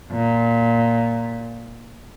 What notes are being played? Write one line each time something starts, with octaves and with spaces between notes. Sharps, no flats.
A#2